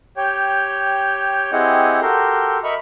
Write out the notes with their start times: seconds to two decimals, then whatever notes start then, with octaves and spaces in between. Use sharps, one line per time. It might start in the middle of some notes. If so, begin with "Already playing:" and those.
0.17 G4 C#5 G5
1.52 C4 E4 G4 G#4 D#5 F#5
2.02 F#4 G4 A4 A#4 C6
2.64 A#4 D#5 E5 B5 C#6 F6